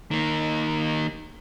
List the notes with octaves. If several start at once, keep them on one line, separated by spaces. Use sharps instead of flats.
D#3 A#3